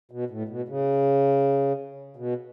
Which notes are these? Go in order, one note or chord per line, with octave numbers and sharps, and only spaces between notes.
B2
A2
B2
C#3
B2